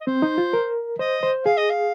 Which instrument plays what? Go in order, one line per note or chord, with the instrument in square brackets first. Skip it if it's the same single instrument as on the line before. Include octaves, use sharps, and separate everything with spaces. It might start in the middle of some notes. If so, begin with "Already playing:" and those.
[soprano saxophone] D#5
[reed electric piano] C4 [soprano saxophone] C5
[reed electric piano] D#4
F4
A#4
[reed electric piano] C5 [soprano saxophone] D#5
[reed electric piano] C5
[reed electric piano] G#4 [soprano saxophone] F5
[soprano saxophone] D#5
F5